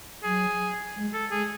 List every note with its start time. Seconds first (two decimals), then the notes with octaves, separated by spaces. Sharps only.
0.23 F#3 G#4
0.96 G#3
1.14 A4
1.31 G#3 G#4